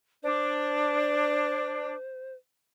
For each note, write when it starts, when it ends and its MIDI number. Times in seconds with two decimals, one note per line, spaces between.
0.23 1.93 62
0.23 2.33 72